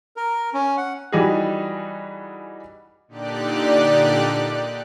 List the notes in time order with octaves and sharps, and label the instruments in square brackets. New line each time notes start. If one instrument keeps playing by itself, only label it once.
[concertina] A#4
C#4
F#5
[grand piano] E3 G3 D#4 F#4 G#4
[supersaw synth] A#2 D3 D#4 G4 D5 F#6